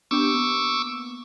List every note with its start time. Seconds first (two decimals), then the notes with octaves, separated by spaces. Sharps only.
0.11 B3 D4 G4 C#6 D6 E6
0.34 A#3 B3